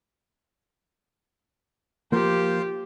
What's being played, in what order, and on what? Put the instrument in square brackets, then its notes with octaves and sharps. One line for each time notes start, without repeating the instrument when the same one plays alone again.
[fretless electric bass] F3 A#3 [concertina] F4 C5 [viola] G4